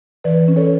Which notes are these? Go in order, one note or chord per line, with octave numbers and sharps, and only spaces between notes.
E3 B4 D5
C#4
A4 C#5